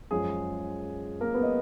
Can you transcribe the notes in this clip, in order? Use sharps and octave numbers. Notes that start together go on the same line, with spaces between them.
F#2 F3 G#3 G#4
A#3 A#4
B3 B4
D#5